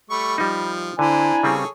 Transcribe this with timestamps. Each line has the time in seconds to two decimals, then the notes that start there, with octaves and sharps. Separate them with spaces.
0.10 G3 A3 B5 C#6
0.38 F3 G3 D#4
0.99 D3 C4 D4 E4 G#5 A#5
1.43 C#3 G3 C4 G#4 A4 C#5